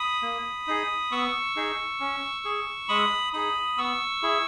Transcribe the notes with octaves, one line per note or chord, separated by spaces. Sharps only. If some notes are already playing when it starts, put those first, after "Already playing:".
Already playing: B5 D#6
A#3
D#4 G#4
B3 C#6 E6
D#4 G#4
C#4
G#4
G#3 B5 D#6
D#4 G#4 B5 D#6
B3 C#6 E6
E4 G#4